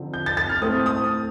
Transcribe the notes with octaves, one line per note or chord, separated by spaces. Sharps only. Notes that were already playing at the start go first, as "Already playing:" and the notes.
Already playing: D3 F3 C4 D#4
G6
A6
A6
F6
A2 A3 C4 D#6
D#6